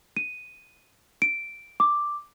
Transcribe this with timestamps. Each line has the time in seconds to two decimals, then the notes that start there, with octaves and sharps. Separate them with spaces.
0.17 D#7
1.22 D7
1.80 D6